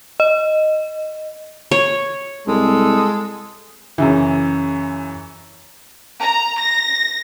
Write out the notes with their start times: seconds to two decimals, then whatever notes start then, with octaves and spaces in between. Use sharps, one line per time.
0.20 D#5
1.71 C#5
2.47 C2 G#3 A4
3.98 F#2 C#3 E3
6.20 A#5
6.58 A#6